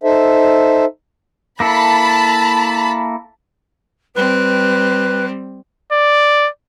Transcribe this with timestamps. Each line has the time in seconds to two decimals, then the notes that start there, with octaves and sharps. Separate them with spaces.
0.03 D#4 A4 C5 E5
1.60 A#3 E4 A4 A5 B5
4.15 G3 C4 B4
5.92 D5